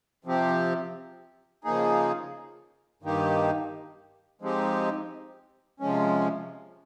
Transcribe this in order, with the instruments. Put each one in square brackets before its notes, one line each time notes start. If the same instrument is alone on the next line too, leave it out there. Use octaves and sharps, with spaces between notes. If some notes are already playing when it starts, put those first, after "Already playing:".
[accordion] C3 F3 C4 G4
C#3 F3 A#3 D#4 G#4
G2 D#3 A#3 D#4 G4
F3 G#3 C4 D#4 G4
C3 F3 G#3 C#4